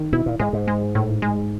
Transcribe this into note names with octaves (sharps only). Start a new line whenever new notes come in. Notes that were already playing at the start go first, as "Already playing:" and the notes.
Already playing: D#3
B2 E4
A#2
G#2 G#3
G#2
G#3
A2
G#3